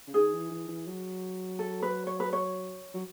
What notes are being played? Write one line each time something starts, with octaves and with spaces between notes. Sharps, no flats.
C#3
D#3 G#4
E3
E3
E3
F#3
A4
B4
C#5
B4
C#5
F#3